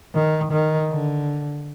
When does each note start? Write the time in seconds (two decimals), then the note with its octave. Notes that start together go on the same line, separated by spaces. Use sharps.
0.14 D#3
0.52 D#3
0.90 D3